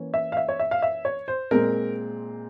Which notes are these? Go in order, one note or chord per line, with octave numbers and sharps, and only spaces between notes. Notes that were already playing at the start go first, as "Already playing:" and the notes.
Already playing: E3 A#3 C#4
E5
F5
E5
C#5
E5
F5
E5
C#5
C5
A#2 G#3 C4 A#4